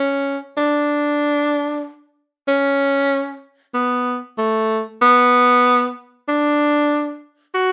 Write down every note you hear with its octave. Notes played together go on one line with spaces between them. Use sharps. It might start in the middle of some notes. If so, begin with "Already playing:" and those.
Already playing: C#4
D4
C#4
B3
A3
B3
D4
F#4